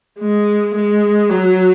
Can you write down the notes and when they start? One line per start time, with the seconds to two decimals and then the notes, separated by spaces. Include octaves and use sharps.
0.19 G#3
0.75 G#3
1.30 F#3